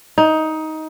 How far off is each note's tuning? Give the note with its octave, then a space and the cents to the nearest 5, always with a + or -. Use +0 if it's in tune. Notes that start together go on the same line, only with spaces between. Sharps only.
D#4 +15